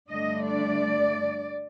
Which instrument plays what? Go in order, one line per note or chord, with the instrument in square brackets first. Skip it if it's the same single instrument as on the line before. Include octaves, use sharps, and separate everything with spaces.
[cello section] G2 D3 A3 D4 D#5
D5